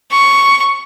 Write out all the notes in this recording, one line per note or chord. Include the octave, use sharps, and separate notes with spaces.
C#6